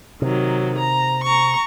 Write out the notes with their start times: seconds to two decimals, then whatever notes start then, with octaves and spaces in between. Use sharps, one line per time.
0.22 C3 D#3 F#3
0.78 A#5
1.24 A#5 C#6